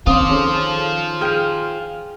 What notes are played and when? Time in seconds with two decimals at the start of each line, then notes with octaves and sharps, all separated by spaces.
0.07 D#3 C4 C#4 F4 C5 F5 D6 D#6
0.29 C#4 G#4 A4
1.21 G#4 G5 F6 D#7